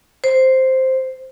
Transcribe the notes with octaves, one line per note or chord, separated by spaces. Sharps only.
C5